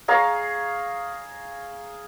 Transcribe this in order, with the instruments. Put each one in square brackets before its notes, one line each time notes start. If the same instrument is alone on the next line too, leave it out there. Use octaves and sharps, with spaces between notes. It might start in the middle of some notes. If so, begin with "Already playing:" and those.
[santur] G#4 F5 A#5 C#6